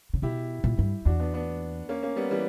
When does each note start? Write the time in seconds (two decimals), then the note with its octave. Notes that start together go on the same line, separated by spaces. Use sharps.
0.14 C#3
0.22 B2 E4 G4
0.64 A#2
0.79 G2
1.05 E2 D4 F#4
1.20 B3 D4
1.34 B3 D4
1.89 A#3 C#4
2.03 A#3 C#4
2.16 G3 B3
2.31 E3 G3